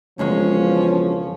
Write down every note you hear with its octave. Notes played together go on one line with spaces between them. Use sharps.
E1 C#2 F#2 F3 G#3 C#4